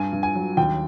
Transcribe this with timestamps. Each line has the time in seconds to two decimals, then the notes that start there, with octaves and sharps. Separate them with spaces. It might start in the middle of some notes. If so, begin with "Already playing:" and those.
Already playing: G2 G#5
0.13 G2
0.23 G#5
0.35 F#3
0.57 D#2 G5